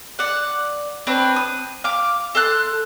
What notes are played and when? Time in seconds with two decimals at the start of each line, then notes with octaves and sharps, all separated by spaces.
0.19 D5 F#5
1.07 C4 D4 B4 C#5
1.36 D#6
1.84 F5 D6
2.35 A4 C6 F#6